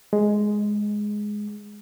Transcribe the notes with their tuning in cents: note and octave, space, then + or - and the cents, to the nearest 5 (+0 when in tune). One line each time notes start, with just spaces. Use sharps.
G#3 +5